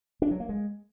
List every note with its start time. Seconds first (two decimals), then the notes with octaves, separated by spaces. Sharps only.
0.22 D4
0.31 F#3
0.40 A#3
0.49 G#3